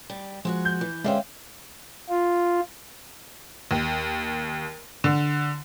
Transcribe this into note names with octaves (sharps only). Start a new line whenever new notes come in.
G3
F3 G#3 F#4 F#5
G6
E3
D3 G#3 C#4 C5 E5 F5 G5
F4
D#2
D3